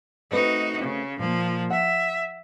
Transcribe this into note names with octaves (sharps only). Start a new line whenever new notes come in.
A3 C4 D#4 F#4 B4
C#3
A#2 F3 A#3
E5 F#5